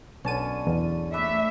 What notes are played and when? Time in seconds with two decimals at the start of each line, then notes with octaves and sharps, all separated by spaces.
0.24 B1 D3 C#4 A5 D#7
0.67 E2
1.14 A3 B4 D5 E5